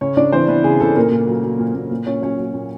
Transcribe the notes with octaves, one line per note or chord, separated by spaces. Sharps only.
C#3 C#4 C#5
C#3 D4 D5
E3 C4 C5
E3 B3 B4
C#3 G#4
C#3 A4
A#2 A#3 A#4
A#2
F#3
F#3
A#2
A#2
A#2
A#2 C#4 C#5
F#3 C#4 C#5
F#3
A#2